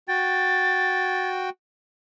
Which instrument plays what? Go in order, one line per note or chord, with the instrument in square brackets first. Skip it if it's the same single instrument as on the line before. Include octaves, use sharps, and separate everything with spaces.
[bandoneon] F#4 G5 [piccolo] A6